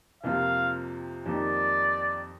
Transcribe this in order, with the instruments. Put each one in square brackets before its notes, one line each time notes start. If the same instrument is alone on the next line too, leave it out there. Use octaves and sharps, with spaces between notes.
[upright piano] F2 C3 F3 A#3 F4 [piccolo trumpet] F5
[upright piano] F2 D#3 A#3 D#4 G4 [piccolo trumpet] D5